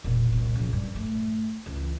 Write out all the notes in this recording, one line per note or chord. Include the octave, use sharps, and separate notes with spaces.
E1 A#2
C2
C#3 F3
G2
A3
C#2 E3